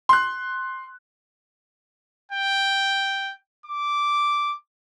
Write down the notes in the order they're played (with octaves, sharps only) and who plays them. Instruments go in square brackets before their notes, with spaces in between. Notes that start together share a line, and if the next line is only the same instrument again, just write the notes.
[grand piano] C6 F#6
[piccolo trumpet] G5
D6